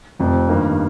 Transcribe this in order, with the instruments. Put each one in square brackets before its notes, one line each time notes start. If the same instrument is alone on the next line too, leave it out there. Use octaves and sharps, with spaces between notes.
[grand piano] F1 F2 C3
G2 D#3 A#3